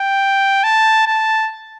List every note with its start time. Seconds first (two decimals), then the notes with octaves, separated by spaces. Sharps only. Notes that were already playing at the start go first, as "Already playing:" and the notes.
Already playing: G5
0.64 A5
1.07 A5